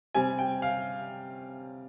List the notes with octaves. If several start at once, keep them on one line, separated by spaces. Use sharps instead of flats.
C3 G3 C4 G#5
G5
F5